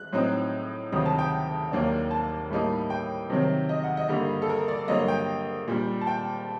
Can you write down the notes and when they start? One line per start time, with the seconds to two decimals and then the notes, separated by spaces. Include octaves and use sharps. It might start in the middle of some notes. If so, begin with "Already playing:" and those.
Already playing: F#6
0.13 A2 F#3 C4 D#4
0.92 D2 C3 D#3 F#3 C4 D#6
1.06 A5
1.19 G5
1.72 D#2 D#3 F#3 A#3 D4
2.11 A5
2.50 A2 G3 A#3 D#4
2.90 G5
3.30 C3 D#3 F#3 C4
3.69 D#5
3.84 F#5
3.97 D#5
4.09 G2 D3 G3 A#3
4.42 A4
4.49 A#4
4.68 D5
4.88 G2 D3 F#3 A#3 D#5
5.08 G5
5.68 A#2 G3 D4
6.01 A5
6.07 G5